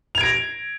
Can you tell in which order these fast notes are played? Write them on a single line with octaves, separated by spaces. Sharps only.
F7 G#6 D7 A#6